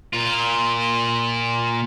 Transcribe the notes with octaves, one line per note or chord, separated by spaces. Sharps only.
A#2 F4